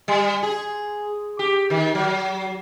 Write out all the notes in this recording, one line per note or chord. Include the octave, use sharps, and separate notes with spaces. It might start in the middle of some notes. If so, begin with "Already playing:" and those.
G3
G#4
G4
D#3
F#3